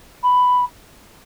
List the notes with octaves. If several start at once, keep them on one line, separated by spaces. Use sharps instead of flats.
B5